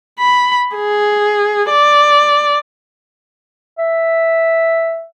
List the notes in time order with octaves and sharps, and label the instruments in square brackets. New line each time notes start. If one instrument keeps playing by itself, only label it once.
[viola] B5
G#4
D5
[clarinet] E5